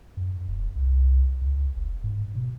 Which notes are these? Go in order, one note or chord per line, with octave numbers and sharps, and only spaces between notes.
F#2
E1
C2
C#2
F1
G#2
B2